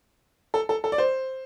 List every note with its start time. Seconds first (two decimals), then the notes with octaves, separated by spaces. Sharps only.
0.54 A4
0.69 A4
0.84 A4
0.92 D5
0.98 C5